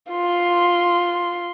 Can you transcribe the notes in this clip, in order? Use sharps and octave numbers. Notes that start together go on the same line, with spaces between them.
F4 C6